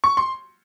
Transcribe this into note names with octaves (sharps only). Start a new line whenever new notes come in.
C#6
C6